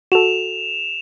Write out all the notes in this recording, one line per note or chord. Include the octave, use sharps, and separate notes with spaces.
F#4 A4 E7 F7